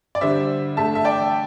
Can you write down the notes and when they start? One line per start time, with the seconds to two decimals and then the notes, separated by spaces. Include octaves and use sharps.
0.15 D5
0.21 D3 G3 C5 E5
0.77 D3 A3 E5 A5
0.95 E5
1.05 D5 G5